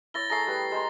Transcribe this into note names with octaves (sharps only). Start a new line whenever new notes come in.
E4 C#5 A6 A#6 G7
A3 G#4 A#5 A#6 C7
G3 B4
G#3 C5 A#5